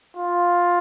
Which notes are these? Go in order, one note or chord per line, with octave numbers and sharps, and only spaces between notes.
F4